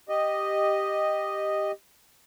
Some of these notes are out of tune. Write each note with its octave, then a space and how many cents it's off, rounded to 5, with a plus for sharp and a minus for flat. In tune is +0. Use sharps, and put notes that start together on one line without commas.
G4 +0 D#5 -5